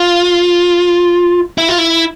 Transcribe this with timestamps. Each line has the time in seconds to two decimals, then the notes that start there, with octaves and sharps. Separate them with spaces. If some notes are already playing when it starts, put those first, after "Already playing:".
Already playing: F4
1.58 E4
1.69 F4
1.78 E4